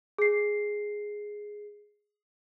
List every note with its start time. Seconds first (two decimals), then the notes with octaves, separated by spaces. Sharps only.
0.18 G#4 C7